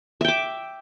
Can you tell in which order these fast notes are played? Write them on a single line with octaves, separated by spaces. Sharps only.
E5 G5 D6